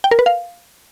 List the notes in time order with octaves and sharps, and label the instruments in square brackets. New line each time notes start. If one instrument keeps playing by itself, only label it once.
[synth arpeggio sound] G5
A#4
B4
F5